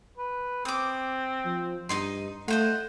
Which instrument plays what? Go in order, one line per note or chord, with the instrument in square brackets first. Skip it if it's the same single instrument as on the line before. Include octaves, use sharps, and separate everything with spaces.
[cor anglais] B4
[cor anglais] C4 [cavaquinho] D6 D#6
[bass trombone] F3
[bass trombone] G2 [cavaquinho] D#4 D#5 C6
[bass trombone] A3 [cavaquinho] F4 C5 D#5 [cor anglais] F#5